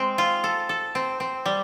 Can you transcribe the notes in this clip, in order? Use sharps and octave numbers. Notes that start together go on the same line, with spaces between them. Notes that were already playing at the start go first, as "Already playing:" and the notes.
Already playing: G#3 C4
F4
A4
A4
C4
C4
G3